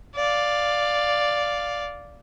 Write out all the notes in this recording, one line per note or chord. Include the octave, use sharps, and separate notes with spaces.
D5 F5